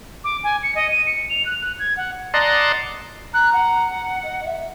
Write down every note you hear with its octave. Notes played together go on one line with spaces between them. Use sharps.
D6
G#5
C#7
D#5
D#7
C#7
F7
F#6
F#6
G#6
F#5
D5 D#5 F#5 A5 A#5 C6
A#5 F#6
F#5
D#5
E5